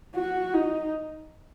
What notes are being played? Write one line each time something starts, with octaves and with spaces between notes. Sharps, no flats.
F#4
D#4